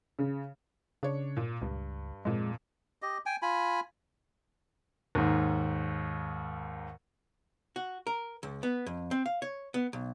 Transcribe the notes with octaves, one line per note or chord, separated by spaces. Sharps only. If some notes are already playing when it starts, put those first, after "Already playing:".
C#3
C#3 D4 C#5
A#2
C#2 G2
F2 A#2 G#3
G4 D#5
G5 G#5
F4 G#5 B5
D#2 G#2
F#4
A#4
C#2
B3
F2
C4
F5
C#5
B3
B1